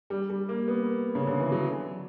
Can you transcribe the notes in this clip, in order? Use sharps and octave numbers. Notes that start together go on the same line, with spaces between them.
G3
G3
A#3
B3
C#3
D3
E3
F#3